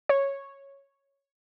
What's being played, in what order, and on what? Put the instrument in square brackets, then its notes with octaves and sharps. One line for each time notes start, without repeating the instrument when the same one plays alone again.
[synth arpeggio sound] C#5